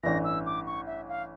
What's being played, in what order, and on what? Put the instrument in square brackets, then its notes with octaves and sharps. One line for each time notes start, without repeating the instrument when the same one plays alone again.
[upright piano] A1 G2 E3 [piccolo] A#6
[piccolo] E6
D6
C#6
E5
F5